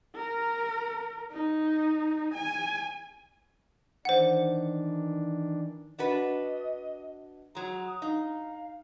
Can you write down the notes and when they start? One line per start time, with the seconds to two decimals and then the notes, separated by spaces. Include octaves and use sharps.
0.16 A#4
1.32 D#4
2.35 G#5
4.05 D#3 E3 D4 C5 F#5
5.99 D4 F#4 B4 D#5
7.55 F#3 G#3 A#5
7.87 D#6
8.02 D#4 F5